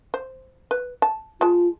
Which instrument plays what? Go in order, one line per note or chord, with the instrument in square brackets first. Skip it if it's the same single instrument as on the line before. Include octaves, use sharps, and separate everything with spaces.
[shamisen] C5
B4
A5
[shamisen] G#3 A5 [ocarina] F4